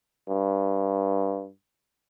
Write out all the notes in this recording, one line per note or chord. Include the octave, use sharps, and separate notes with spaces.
G2